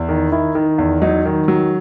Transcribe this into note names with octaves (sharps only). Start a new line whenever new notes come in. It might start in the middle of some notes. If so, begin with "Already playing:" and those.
Already playing: E2
D#3
D#3 E4
D#3
E2
F#3 D#4
D#3
F#3